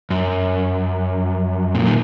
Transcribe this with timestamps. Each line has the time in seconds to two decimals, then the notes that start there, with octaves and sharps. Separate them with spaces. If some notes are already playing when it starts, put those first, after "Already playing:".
0.10 F#2
1.75 A#2
1.87 D#3